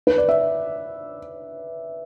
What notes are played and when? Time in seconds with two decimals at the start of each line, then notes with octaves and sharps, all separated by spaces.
0.07 B4
0.18 D5
0.29 E5